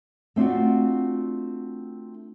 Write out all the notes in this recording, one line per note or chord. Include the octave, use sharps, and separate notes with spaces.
A3 C4 D4 F4 F#4